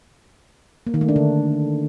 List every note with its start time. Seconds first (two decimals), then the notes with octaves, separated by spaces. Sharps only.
0.87 A#3
0.94 D#3
1.01 A3
1.09 D4
1.16 D3